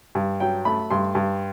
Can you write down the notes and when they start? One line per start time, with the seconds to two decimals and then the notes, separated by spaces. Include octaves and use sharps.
0.15 G2
0.40 F#3 G5
0.65 A3 B5
0.91 G2 C6
1.15 G2